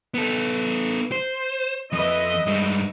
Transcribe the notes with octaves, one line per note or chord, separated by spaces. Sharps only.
B3 A4
C5
F2 B4 D#5 E5
G2 G#3